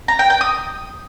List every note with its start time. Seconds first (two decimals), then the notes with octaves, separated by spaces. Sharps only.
0.08 A#5
0.19 G5
0.30 G5
0.41 D#6